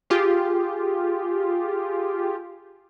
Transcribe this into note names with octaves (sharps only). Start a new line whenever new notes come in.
F4 G4 G#4